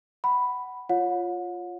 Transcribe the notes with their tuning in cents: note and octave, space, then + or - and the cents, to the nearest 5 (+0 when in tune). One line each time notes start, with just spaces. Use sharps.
F#5 +15 B5 +0
F4 +0 C#5 +0 F#5 -40